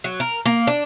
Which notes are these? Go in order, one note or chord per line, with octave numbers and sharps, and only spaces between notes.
F#3
A#4
A#3
D4